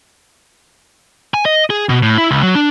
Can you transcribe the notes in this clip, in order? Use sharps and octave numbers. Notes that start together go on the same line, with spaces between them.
G#5
D#5
G#4
B2
A2
E4
C#2
F#3
D4